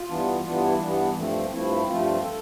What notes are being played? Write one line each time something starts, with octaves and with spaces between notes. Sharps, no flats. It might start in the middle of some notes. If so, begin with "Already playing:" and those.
Already playing: F4
G2 E3 B3 D4
G2 E3 B3 D4 F4
E4
G2 E3 B3 D4
G2 F3 A3 C4
G2 F3 A3 C4 E4
G2 F3 A3 C4 F4
A4